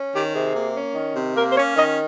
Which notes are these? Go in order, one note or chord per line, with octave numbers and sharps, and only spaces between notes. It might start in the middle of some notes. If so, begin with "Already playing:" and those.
Already playing: C#4
D#3 G4
C3 G#4
A#3
C#4
D#3
C3
A#3 A#4
C5
C#4 C#5
D#3 D#5